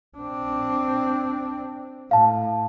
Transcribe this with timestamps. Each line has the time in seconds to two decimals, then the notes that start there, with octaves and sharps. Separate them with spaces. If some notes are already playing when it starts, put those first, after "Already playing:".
0.18 C4 D4
2.11 A2 F5 A5